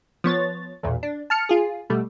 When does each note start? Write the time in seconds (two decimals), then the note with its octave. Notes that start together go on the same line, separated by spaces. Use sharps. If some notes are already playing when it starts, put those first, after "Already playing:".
0.24 F3 B3 C#5 A6
0.83 B1 E2 A#2
1.03 D4
1.30 A5 F6 C#7
1.49 F4 G#4
1.90 B2 G3 A3